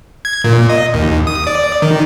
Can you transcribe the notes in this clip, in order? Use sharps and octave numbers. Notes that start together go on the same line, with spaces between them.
G#6
A#2
D#5
D#2
D#6
D5
D#3